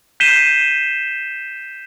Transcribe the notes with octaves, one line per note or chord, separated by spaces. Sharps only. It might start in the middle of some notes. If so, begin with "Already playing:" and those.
G6 B6 C7 D#7 E7 G7